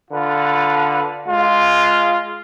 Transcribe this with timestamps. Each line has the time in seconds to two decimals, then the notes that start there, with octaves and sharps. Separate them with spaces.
0.11 D3 F4 B4
1.28 G#3 F4